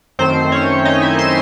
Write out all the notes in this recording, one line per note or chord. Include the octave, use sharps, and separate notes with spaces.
F#2 D#3 A3 C4 C5
C#4 C#5
D#4 D#5
E4 E5
C5 C6